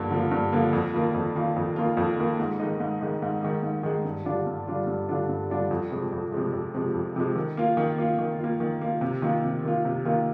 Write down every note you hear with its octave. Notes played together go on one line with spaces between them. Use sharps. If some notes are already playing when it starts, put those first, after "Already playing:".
Already playing: G2 D3 F3 A#3
D3 F3 A#3
G2
D3 F3 A#3
F2
D#3 A#3 F4
F2
D#3 A#3 F4
F2
D#3 A#3 F4
F2
D#3 A#3 F4
G#2
D#3 G#3 D#4
G#2
D#3 G#3 D#4
G#2
D#3 G#3 D#4
G#2
D#3 G#3 D#4
G2
D3 G3 D4 F4
G2
D3 G3 D4 F4
G2
D3 G3 D4 F4
G2
D3 G3 D4 F4
F2
C3 F3 G#3
F2
C3 F3 G#3
F2
C3 F3 G#3
F2
C3 F3 G#3
D#3
A#3 F4
D#3
A#3 F4
D#3
A#3 F4
D#3
A#3 F4
C3
D#3 A#3 F4
C3
D#3 A#3 F4
C3
D#3 A#3 F4